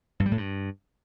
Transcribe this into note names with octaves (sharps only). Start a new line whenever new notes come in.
G2
G3
A2
G2